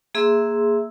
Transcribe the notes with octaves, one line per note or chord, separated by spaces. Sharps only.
A#3 G#4 E5 C6 E6